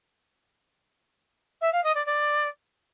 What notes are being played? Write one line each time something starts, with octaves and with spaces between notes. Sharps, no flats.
E5
F5
D#5
D5
D5